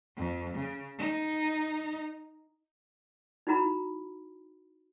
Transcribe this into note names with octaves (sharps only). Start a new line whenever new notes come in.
F2
C#3
D#4
D#4 E4 F#4 A#5 B5